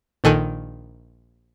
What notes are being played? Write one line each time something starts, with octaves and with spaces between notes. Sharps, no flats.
A#1 A#2 D#3 A4 G#5 F#6